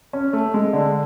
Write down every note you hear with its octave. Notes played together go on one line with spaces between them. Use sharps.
C#4
A3
G#3
D3